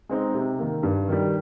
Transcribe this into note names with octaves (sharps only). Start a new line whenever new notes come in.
G#3 C4 D#4
C3
D#3 A#3
G2
D#3 G3